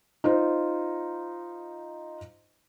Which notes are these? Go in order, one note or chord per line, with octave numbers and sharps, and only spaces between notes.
D#4 F4 C5